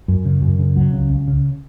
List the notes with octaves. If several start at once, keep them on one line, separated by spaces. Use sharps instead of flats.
F#2
C#3
F#2
C#3
C#2 F#3
C#3
C#2
C#3